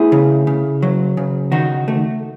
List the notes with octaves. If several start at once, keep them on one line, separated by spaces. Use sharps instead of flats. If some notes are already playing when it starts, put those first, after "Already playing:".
Already playing: A3 E4 G#4
C#3
C#3
F#3
C#3
D#3 D#4 F#4
A3